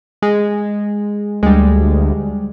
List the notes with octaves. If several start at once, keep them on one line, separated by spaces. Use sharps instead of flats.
G#3
D2 G3 G#3